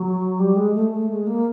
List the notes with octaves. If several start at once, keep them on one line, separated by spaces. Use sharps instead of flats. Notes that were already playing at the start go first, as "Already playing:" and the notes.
Already playing: F#3
G3
G#3
A3
A3
G#3
A#3